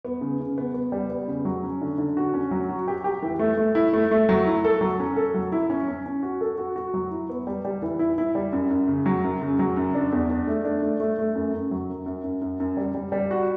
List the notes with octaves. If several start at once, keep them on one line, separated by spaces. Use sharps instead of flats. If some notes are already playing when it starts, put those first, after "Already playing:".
B3
C#3
C#3
B3
B3
G3
B3
C#3
F#3
C#4
D3
D3
F#4
C#4
F#3
F#4
G4
G4
E3
A3
A3
E4
A3
A3
F#3
E4
A4
F#3
C#4
A4
F#3
E4
C#4
C#4
C#4
F#4
A4
F#4
F#4
F#3
E4
B3
G3
G3
E3
E4
E4
G3
F#2
F#2
C#3
F#3
F#2
C#3
F#3
F#2
D4
E2
D4
A3
D4
A3
A3
A3
F#2
F#2
F#3
F#2
F#2
F#2
F#2
F#2
G3
G3
G3
F#4